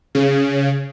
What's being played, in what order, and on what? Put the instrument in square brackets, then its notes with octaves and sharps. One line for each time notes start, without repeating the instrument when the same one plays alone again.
[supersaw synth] C#3